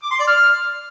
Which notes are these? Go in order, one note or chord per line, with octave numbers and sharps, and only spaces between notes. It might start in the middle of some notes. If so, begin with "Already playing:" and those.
D6
C6
D5
F6